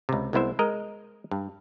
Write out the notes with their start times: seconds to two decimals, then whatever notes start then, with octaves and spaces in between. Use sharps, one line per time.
0.09 C#2 C3
0.33 C2 G#3 B3 E4 C5 E5
0.59 G#3 A#4 D#5
1.31 G2